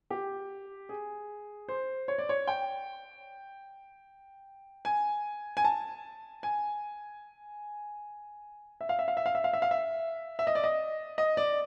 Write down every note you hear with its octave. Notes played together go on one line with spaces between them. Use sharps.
G4
G#4
C5
C#5
D5
C#5
G5
G#5
G#5
A5
G#5
E5
F5
E5
F5
E5
F5
E5
F5
E5
F5
E5
E5
D#5
D5
D#5
D#5
D5